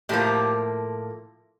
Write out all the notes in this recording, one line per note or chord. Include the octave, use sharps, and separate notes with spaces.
A2 F3 A#3 G4